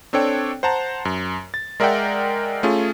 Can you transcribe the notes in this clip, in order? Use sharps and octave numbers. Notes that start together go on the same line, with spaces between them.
C4 D4 A4 C#5 G5
C5 F#5 A5 A#5
F#2
A6
G#3 A#4 D5 E5 F#5 G5
A3 C#4 F4 G#4